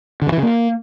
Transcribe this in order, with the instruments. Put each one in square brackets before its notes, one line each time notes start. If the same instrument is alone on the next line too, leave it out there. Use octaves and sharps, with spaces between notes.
[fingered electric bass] D3
G2
E3
C#3
A#3